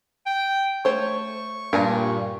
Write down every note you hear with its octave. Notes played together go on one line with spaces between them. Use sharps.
G5
A3 C5 C#5 C#6
G2 A#2 A#4 F5 G#5